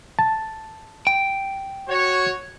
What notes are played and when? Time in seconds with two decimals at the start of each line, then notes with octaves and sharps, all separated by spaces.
0.19 A5
1.07 G5
1.88 F#4 C#5